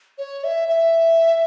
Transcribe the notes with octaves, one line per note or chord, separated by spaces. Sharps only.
C#5
E5
E5